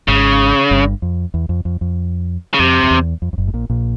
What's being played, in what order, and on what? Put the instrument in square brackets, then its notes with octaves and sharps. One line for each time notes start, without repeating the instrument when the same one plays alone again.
[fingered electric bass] G#1 G#2 [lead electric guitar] C#3
[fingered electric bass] G1 G2
F2
E2
F2
F2
F2
[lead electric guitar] C#3
[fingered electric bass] F2 [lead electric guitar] C3
[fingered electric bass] F2
E2
F2
F2
F#1 F#2
A2
A#1 A#2
A#1 A#2